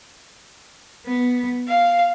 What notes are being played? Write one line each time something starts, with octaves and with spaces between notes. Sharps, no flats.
B3
F5